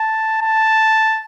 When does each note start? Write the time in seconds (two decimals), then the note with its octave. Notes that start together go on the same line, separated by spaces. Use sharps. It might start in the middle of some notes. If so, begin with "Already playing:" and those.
Already playing: A5
0.42 A5